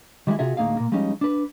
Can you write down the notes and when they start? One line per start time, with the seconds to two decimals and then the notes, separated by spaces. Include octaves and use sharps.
0.27 D#3 G3 G#3 E4
0.39 C3 F4 F#4 G#4 E5
0.57 D2 A2 A#3 D#4 G#4 F5
0.76 A#2 A#3
0.92 F3 G3 G#3 C#4 D#4
1.21 D4 B4